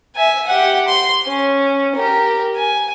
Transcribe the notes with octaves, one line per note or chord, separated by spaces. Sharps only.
E5 G#5
G4 F#5
C6
C#4
G4 A#4
G#5